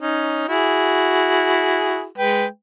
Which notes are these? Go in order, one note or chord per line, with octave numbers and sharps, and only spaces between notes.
C#4 D#4
E4 F#4 G#4
G#3 B4 G5